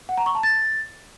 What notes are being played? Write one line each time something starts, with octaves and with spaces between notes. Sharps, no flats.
F#5
A#5
C#6
A5
A6